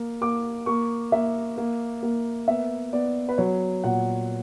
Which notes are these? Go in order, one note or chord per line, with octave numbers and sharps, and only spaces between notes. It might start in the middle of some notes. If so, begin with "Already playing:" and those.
Already playing: A#3
A#3 D6
A#3 C#6
A#3 E5
A#3
A#3
B3 E5
B3 D5
B4
F#3 C#5
A#2 F#5